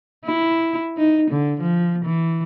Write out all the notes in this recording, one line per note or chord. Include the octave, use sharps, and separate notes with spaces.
E4
D#4
D3
F3
E3